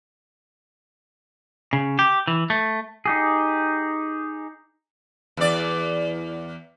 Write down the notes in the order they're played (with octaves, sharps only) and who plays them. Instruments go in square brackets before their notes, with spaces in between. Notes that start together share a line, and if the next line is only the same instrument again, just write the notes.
[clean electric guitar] C#3
G4
E3
A3
[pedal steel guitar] D#4 G4 G#4
[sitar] E2 D5